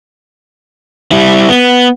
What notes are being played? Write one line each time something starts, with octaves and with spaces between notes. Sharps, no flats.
G3 E4
B3